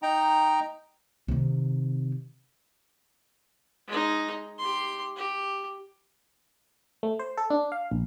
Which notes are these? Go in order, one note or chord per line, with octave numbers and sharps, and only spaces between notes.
D#4 G5 A#5
C3 D#3
G#3 D#4
G4 C6
G4
A3
C5
A4
D4
F5
A#1